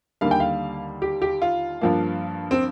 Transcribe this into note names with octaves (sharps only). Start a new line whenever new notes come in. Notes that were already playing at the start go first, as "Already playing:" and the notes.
D#2 D3 G3 A#3 F5
G5
F5
G4
G4
F4
G2 F3 A#3
C4